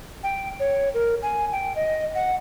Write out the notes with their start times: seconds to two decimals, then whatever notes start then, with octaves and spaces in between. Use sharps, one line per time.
0.23 G5
0.60 C#5
0.94 A#4
1.23 G#5
1.52 G5
1.76 D#5
2.15 F#5